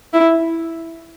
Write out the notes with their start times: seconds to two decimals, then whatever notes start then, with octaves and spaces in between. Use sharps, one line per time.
0.13 E4